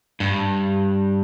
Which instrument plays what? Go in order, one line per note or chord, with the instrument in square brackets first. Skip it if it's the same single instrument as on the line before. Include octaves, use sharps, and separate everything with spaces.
[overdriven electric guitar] G2